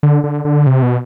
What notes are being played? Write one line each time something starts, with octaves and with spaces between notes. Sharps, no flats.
D3
D3
D3
C3
B2